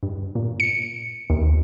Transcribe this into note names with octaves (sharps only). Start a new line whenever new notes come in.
G2
A#2
C#7
D#2